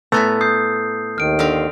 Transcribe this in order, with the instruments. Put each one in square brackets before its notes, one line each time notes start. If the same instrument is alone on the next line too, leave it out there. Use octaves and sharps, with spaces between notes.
[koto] A2 G#5 A#5 [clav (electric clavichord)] A3 B3
[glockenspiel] D#6 G6 C7
[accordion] D#2 D#3 [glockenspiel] F6 D7
[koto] D3 C4 F5